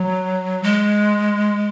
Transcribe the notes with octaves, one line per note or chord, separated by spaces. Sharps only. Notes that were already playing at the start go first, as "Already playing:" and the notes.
Already playing: F#3
G#3